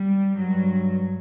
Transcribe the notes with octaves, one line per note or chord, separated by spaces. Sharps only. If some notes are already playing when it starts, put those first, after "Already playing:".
Already playing: G3
G2 F#3